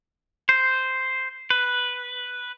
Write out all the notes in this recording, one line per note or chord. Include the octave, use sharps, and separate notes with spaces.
C5
B4